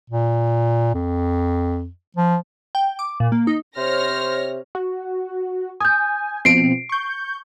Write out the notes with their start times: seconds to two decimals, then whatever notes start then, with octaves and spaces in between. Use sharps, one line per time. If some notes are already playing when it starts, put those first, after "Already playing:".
0.10 A#2
0.94 F2
2.17 F3
2.75 G5
2.99 D6
3.20 A#2
3.32 A#3
3.47 D#4
3.77 C3 C5 C#5 F6 A#6
4.75 F#4
5.81 G#5 D#6 G6
6.45 B2 F3 C4 C7 D7
6.89 C#6 G6